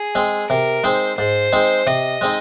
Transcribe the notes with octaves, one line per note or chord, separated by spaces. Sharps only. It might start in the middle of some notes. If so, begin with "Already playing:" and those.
Already playing: G#4
G#3 C4
C3 A#4
G#3 C4 D#4 C5
G#2 C5
G#3 C4 D#4
C3 D#5
G#3 C4 D#4